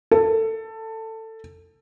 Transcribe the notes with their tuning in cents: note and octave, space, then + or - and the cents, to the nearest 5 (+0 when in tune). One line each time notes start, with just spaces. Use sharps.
A4 +15